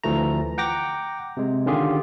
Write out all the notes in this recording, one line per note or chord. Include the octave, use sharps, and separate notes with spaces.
D2 E3 F3 A3 A#5
F#5 G5 A#5 D6 A#6
C3 G#3
D3 D#3 C#4 F4 G4 G#4